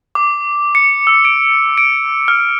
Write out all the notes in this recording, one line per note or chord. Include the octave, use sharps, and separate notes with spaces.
D6
C#7
E6
D7
D7
F6